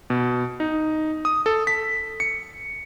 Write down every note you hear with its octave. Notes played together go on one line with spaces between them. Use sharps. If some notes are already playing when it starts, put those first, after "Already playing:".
B2
D#4
D#6
A4
B6
C#7